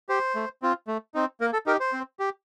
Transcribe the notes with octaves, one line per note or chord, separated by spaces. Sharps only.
G4 C5
A3
C4 F4
A3
C4 D#4
A#3 A#4
A4
D#4 G4 A#4
C5
C4
G4